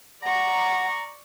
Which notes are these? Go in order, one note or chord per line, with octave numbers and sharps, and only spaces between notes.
D5 F#5 A#5 C#6